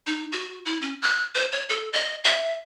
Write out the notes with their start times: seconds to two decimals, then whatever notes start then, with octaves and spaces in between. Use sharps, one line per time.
0.07 D#4
0.32 F#4
0.65 E4
0.82 C#4
1.02 F#6
1.35 C5
1.52 C#5
1.69 A4
1.93 D#5
2.24 E5